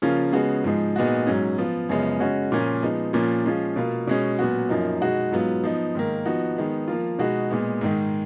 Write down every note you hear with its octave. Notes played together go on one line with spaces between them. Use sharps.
C#3 F3 A#3 C#4 F4
C#3 G#3 B3 F#4
G#2 F3 G#3
A#2 G#3 B3 D#4 F#4
G#2 F#3 C#4
F3 B3 F4
F#2 C#3 F3 G#3 B3
C#3 G#3 C#4 F#4
A#2 F3 A#3 C#4
F3 G#3 B3 D#4
A#2 F3 A#3 C#4
F3 G#3 C#4 F4
B2 A#3 F4
B2 G#3 C#4
A#2 F#3 B3 F#4
F#2 F3 A#3 D#4
B2 G#3 D#4 F#4
G#2 F#3 B3 F4
F3 B3 D#4
G#2 D#3 A#3
F3 B3 D#4 F#4
D#3 G#3 B3 D#4
F3 A#3 F4
B2 G#3 D#4 F#4
A#2 G#3 B3
G#2 D#3 G#3